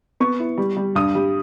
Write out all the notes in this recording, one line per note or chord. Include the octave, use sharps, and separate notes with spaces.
B3 C#6
E4
G3
G3
G2 D#6
G3